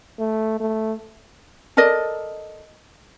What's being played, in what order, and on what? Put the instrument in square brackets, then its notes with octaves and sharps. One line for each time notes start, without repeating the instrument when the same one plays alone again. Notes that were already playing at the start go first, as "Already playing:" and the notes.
[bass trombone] A3
A3
[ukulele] A4 A#4 D5 D#5